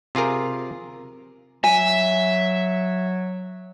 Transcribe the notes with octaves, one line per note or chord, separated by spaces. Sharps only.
C3 F4 G#4 A#4
F#3 E5 G#5